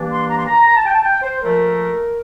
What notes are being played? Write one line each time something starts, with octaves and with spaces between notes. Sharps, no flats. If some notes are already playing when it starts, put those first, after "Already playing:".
Already playing: G2 E3 A#3 D4
C6
A#5
C6
A#5
A#5
A5
G5
A5
G5
C5
A#2 F3 A3 A#4